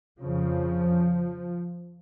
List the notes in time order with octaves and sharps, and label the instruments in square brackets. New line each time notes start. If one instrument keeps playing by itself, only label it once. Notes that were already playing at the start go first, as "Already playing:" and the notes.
[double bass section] F2 C#3 F3